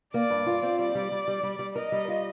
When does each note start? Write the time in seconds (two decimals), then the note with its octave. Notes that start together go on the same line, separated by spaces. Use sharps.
0.14 A#3 D5
0.30 G2
0.46 F4
0.63 C4
0.79 G3 D5
0.95 G3
1.12 G3
1.28 G3
1.43 G3
1.59 G3
1.75 A#4 D#5
1.92 G3
2.08 F4